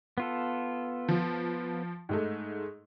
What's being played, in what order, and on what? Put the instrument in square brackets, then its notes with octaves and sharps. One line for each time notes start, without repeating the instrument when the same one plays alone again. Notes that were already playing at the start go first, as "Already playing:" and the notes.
[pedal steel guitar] B3 F4 A4
[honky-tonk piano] F3
G#2 G#3 A3